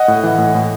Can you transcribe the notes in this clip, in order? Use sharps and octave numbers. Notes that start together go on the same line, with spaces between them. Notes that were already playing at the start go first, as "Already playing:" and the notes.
Already playing: D#5 F#5
A2
E3
A2
A2